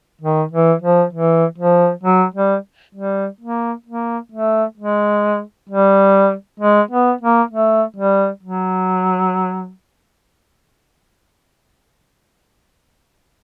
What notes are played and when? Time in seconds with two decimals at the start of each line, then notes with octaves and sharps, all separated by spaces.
0.21 D#3
0.52 E3
0.82 F3
1.13 E3
1.58 F3
2.03 F#3
2.34 G3
2.95 G3
3.41 A#3
3.86 A#3
4.32 A3
4.78 G#3
5.69 G3
6.60 G#3
6.91 B3
7.21 A#3
7.51 A3
7.96 G3
8.43 F#3